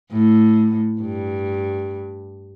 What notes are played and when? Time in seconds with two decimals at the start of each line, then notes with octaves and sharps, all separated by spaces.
0.12 A2
1.02 G2